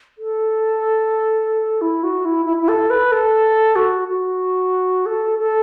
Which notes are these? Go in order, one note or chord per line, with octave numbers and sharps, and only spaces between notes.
A4
E4
F#4
E4
E4
E4
A4
B4
A4
F#4
F#4
A4
A4